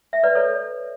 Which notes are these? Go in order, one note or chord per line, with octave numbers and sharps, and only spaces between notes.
E5
B4 D5
A4 C#5